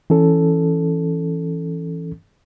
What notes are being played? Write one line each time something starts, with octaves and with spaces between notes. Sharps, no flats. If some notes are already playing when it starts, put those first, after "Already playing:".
E3 C#4 A4